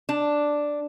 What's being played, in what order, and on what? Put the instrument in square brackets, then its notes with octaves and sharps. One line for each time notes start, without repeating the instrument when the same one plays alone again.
[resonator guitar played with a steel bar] D4